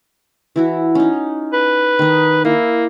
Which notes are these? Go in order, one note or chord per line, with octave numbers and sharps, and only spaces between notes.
E3 E4 F#4
C#4 D#4
B4
D#3 D#4
A#3 E4